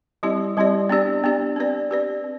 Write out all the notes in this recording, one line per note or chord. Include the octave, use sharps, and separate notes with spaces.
G3 C4 E4 G4 D5
G3 C4 E4 G4 D5
B3 D4 G4 D5
B3 D4 G4 D5
C4 G4 B4 D5
C4 G4 B4 D5
C4